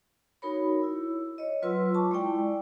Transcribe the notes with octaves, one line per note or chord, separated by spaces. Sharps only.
D#4 F#4 A#4 C#5 B5
E4 E6
C#5 D#5
F#3 F4 B4 C6 E6
A5 C#6 D6
G#3 E4 D5 G5 G#5